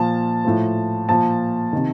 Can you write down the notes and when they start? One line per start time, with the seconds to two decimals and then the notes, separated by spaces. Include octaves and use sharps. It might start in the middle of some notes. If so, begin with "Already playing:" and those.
Already playing: A#2 F3 A5
0.45 A2 F3
1.09 A#2 F3 A5
1.73 C3 D#3